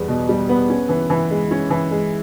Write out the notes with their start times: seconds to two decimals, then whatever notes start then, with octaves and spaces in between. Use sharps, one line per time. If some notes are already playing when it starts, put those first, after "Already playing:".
Already playing: E2 G3 B3
0.08 B2
0.29 G3
0.49 B3
0.69 C#4
0.89 E3
1.10 E3
1.30 G#3
1.51 C#4
1.70 E3
1.91 G#3